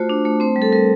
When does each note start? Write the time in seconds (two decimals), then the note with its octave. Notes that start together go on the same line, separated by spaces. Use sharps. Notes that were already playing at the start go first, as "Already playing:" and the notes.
Already playing: A3 F4 F#4 C5
0.09 D4
0.25 A3
0.40 C4 C5
0.56 G3
0.62 A4
0.72 G3 A#4